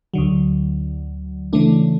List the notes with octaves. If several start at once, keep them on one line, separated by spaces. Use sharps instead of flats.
D2 D3 F#3
C#3 E3 A3 D4